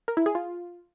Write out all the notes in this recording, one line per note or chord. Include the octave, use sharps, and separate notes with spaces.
A#4
E4
G#4
F4